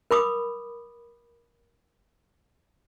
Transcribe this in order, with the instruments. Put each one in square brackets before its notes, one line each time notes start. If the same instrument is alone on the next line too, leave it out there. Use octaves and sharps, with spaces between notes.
[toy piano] A#4 B5 D6 D#6